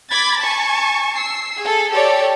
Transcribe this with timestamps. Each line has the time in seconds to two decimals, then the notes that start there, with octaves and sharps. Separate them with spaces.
0.10 B5 D6 G#6 A6
0.42 G#5 A5 C#6
1.14 E6 C7
1.59 G#4 A4
1.91 G4 A4 C#5 D5